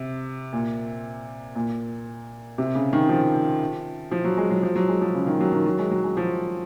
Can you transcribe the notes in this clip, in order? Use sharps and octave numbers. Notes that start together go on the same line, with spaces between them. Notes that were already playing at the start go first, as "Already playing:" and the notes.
Already playing: C3
A#2
A#2
C3
C#3
D#3
F3
F3
F#3
G#3
F#3
F3
F#3
G#3
F3
C#3
D#3
F#3
D#3
F#3
G#3
F#3
G#3
F3